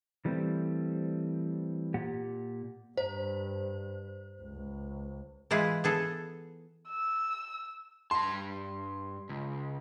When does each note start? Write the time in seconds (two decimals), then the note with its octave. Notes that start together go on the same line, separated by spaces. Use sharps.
0.25 E3 G3 A3 B3 C4
1.94 A#2 G4 F#5
2.97 G2 C5
4.42 C#2
5.51 E3 G#3 E4 F4 G#4 B4
5.84 B3 G#4 A4
6.88 E6
8.11 G2 A5 C6
9.29 C#2